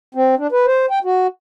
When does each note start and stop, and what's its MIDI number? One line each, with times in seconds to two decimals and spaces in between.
0.15 0.35 60
0.38 0.47 62
0.52 0.66 71
0.66 0.86 72
0.91 0.99 79
1.04 1.27 66